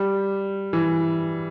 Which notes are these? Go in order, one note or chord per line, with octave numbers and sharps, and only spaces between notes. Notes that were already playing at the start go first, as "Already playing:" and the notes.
Already playing: G3
E3